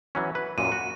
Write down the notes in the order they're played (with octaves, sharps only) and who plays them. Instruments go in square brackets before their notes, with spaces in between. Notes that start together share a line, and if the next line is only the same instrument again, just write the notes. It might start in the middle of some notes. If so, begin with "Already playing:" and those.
[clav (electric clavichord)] E3 F#3 C#4
B4
[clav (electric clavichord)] F#2 A#2 [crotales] D#7
[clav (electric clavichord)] F#4